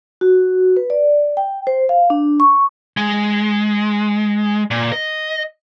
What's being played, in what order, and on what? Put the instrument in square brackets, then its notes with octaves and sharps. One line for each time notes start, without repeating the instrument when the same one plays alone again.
[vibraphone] F#4
B4
D5
G5
C5
F5
D4
C#6
[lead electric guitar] G#3
A#2
D#5